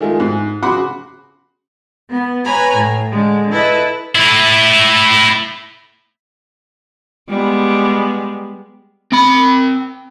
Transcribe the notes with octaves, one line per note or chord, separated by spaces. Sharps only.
D#3 G#3 A3 F4
G#2
C#3 F#4 F#5 B5 C6 D6
B3
B4 C#5 G#5 A#5 B5
A2
D3 G#3
E4 A4 B4 D#5
A3 E4
G3 G#3 B3
C4 B5